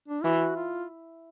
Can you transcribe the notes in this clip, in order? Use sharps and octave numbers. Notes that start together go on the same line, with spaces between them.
D4
E3 F#4
F4